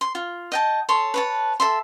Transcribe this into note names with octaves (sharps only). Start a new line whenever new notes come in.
C6
F4
D#5 G5 A5
A4 C#5 A5 C6
B4 C#5 A5
A4 E5 C6